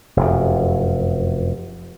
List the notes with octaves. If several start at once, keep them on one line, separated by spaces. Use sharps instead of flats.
F1 F#2